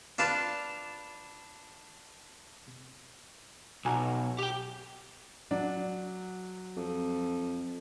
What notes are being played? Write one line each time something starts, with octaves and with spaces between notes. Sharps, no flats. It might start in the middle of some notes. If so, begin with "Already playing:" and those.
D4 F4 B4 A5
B1 F#4 G#5 A#5
G4 G5
F#3 D4
F2